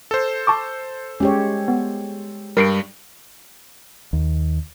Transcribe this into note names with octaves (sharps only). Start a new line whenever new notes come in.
A4 C5
A5 C#6 D6
G#3 C#4 G4 C#5
B3
G2 G3 A#4 C7 D7
D#2